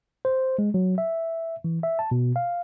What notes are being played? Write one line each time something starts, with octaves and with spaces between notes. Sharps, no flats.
C5
G#3
F#3
E5
E3
E5
A5
B2
F5